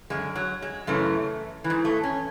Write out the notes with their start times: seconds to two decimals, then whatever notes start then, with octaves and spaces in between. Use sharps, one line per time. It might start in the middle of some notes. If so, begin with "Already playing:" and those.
0.10 F#2 D3 G#3
0.35 F#3
0.62 G#3
0.87 F#2 C#3 E3 A3
1.64 E3
1.70 G#2
1.85 A3
2.03 C#4